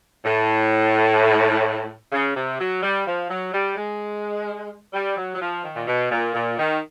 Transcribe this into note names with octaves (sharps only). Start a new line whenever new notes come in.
A2
C#3
C3
F#3
G3
F3
F#3
G3
G#3
G3
F#3
F#3
F3
D#3
A#2
B2
A#2
A#2
D#3